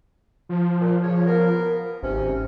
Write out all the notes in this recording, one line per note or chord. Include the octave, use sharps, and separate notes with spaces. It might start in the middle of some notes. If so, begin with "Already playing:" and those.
F3
A#2
C#3 C#5
A#3 B3 A#4
G#1 C3 C#4